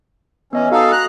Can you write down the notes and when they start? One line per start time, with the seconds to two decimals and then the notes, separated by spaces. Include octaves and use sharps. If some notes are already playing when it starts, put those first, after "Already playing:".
0.53 E3 B3 C#4 D#5 G#5
0.72 D#4 F#4 A4 F5 D#6
0.92 A#5 F#6